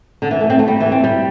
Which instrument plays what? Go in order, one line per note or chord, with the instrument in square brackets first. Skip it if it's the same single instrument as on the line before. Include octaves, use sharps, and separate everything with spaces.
[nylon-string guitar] D3
E3
A3
C4
A3
G3
E3
C4
G3